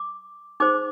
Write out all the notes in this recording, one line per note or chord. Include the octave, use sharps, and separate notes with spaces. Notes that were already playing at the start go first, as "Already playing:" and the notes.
Already playing: D6
D#4 G#4 C5 D6